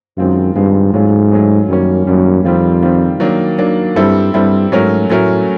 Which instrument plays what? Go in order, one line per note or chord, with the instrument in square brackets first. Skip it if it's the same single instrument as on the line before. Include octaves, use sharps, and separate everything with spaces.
[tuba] F#2 [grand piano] D#3 G#3 C4 F4
[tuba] G2 [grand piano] D#3 G#3 C4 F4
[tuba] G#2 [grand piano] F#3 A3 C#4 F4 G#4
[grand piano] F#3 A3 C#4 F4 G#4
[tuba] F#2 [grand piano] D#3 G3 A#3 C#4
[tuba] F#2 [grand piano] D#3 G3 A#3 C#4
[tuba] F2 [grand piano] D#3 G3 C4 F4
[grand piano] D#3 G3 C4 F4
D#3 F#3 A#3 D4
D#3 F#3 A#3 D4
[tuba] G2 [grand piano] G3 C4 E4 A4
[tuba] G2 [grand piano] G3 C4 E4 A4
[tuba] G#2 [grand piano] F#3 A3 C#4 F#4 A#4
[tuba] A2 [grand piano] F#3 A3 C#4 F#4 A#4